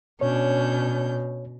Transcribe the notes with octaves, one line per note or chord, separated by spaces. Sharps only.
B2 C#4 D4 C#5 G6